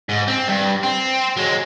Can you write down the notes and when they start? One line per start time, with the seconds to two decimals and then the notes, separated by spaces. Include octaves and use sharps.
0.09 G#2
0.28 C4
0.48 G2
0.83 C4
1.37 F#3 G#3